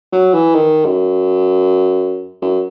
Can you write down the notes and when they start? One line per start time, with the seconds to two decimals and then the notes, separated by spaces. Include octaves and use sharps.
0.13 F#3
0.34 E3
0.55 D#3
0.86 F#2
2.42 F#2